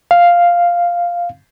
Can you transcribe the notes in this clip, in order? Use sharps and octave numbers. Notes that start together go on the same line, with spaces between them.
F5